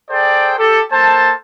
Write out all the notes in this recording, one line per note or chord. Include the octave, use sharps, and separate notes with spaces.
G#4 A4 C5 D5 G5
G4 A4
A#3 A4 C5 A5